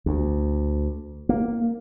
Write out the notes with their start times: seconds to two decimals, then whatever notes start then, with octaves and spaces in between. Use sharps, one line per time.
0.06 D2
1.29 A#3